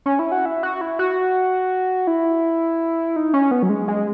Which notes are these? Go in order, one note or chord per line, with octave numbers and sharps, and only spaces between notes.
C#4
E4
F#4
E4
F#4
E4
F#4
E4
D#4
C#4
B3
F#3
G#3
G#3